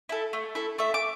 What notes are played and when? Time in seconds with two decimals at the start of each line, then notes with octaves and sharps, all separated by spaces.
0.09 E4 A4
0.33 A3
0.55 E4 A4
0.78 A3 E5
0.94 D6